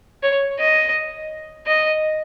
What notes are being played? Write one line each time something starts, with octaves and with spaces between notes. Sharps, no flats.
C#5
D#5
D#5